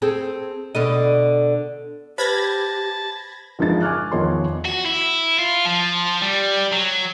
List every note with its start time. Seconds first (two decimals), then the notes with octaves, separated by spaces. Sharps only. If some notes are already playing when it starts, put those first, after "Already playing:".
0.02 C4 G#4 A4
0.75 B2 D3 D#5
2.18 G4 B4 C5 A5 B5 G#6 A#6
3.59 G1 E3 F3 G#3 D#4 A6
3.82 G#5 C#6 D6 F6 F#6
4.12 E2 D#3 F3 C#5 D#5 C6
4.65 F#4
4.86 E4
5.39 F4
5.65 F3
6.22 G3
6.73 F#3